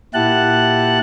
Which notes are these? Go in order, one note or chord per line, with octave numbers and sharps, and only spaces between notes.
A#2 E4 G4 F#5 A5 F#6